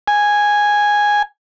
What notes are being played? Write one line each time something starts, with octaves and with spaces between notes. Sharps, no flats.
G#5